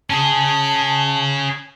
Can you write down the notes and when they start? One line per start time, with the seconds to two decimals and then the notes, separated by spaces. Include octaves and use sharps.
0.10 C#4 G#4 A5